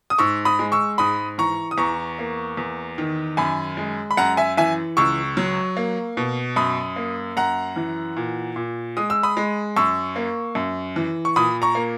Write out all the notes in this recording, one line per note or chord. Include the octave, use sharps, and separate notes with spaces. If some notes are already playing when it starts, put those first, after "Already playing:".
D#6
G#2 C#6 E6
B5 D#6
G#3
C#6 E6
G#2 B5 D#6
E3 A#5 C#6
D#6
E2 A#5 C#6
A#3
E2
D#3
F#2 G#5 B5
G#3
B5
F#2 F#5 A#5
E5 G#5
E3 E5 G#5
C#2 C#6 E6
F#3
A#3
B2
F#2 B5 D#6
A#3
F#2 F#5 A#5
E3
A#2
A#2
G#3 D#6
E6
B5 D#6
G#3
F#2 C#6 E6
A#3
F#2
E3
C#6
A#2 B5 D#6
A#5 C#6
A#3